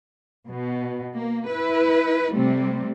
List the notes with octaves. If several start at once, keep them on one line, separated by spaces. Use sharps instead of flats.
B2
A#3
E4 B4
C3 G3 A3